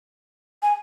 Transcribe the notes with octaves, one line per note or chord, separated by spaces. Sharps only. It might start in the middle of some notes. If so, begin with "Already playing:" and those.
G#5